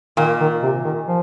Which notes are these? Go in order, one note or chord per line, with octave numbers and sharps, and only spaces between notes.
A#2 D#3
D#3
C3
D#3
F3